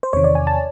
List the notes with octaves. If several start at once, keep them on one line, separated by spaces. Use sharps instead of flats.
C5
E2 C3 D#3 C#5
D5
G#5
A5